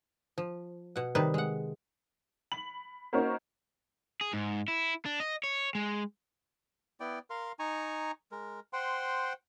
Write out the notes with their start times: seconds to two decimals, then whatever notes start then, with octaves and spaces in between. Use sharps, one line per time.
0.38 F3
0.96 B2 F#5
1.15 C3 D#3 G3 D#4 B4
1.34 G#3 F#5
2.52 B5 F#7
3.13 A#3 C#4 D#4 F#4 A#4 C5
4.21 G#4
4.33 G#2
4.68 E4
5.06 D4
5.20 D#5
5.44 C#5
5.75 G#3
7.00 B3 E4 D5 G5
7.30 A#4 F5 C6
7.59 D#4 G#5 A#5 C#6
8.32 G#3 A#4
8.73 C5 F#5 G5 C6